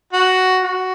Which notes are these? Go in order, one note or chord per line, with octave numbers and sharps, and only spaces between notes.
F#4
F#4